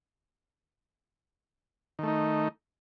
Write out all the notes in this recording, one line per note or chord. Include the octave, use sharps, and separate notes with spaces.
D#3 A3 D#4